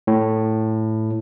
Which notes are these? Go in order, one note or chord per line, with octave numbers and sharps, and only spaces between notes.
A2